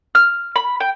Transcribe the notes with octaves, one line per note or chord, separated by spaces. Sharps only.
F6
B5
G5